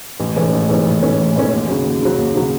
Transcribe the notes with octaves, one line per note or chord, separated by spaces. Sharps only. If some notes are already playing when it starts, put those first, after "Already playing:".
A1
G#2 E3 A3 C#4
A1
G#2 E3 A3 C#4
A1
G#2 E3 A3 C#4
A1
G#2 E3 A3 C#4
D#2
C#3 F#3
D#2
C#3 F#3
D#2
C#3 F#3